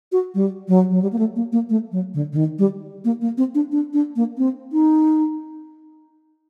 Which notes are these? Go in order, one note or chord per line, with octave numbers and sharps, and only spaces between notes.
F#4
G3
F#3
F#3
G3
A#3
A3
A#3
A#3
A3
F#3
D3
D3
D#3
G3
A#3
A#3
C4
D4
D4
D4
A#3
C4
D#4